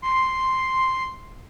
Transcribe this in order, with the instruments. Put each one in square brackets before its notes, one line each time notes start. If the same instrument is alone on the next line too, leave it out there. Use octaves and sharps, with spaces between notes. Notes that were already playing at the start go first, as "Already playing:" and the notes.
[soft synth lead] C6